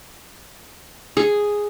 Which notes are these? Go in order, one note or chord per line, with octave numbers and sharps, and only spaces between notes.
G#4